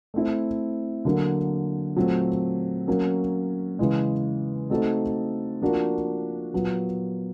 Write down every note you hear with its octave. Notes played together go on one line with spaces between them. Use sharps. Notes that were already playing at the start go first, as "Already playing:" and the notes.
A3 C4 E4
D3 F#3 A#3
A#2 F#3 A3 C4
F#3 A#3 C#4
C#3 E3 G#3
A3 C4 D#4 F#4 A4
F3 A#3 D4 F#4 A#4
A#2 F#3 B3